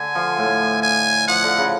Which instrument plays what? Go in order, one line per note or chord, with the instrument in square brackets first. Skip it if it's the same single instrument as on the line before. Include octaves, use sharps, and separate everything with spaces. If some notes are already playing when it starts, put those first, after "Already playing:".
Already playing: [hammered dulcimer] D3 [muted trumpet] G#5
[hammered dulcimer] F3
A2
[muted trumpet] G#5
[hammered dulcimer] F3 [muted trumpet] F#5
[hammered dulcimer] D3
C#3